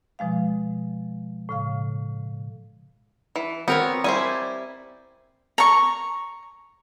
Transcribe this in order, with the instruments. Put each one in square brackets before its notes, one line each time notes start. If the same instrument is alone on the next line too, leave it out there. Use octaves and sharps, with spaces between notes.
[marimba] B2 F3 G#3 F5
A2 C#3 F5
[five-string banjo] E3
[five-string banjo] B3 [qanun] C4 A#4 C#5
[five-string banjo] G3 E4 C5 [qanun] G#5
[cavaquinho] A#5 C#6